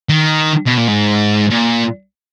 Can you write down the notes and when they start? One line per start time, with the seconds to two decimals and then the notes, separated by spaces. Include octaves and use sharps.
0.09 D#3
0.66 B2
0.77 A#2
0.87 G#2
1.51 A#2